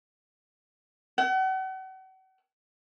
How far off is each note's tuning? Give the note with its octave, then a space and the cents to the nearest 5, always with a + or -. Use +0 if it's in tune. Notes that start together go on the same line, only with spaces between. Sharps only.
F#5 +40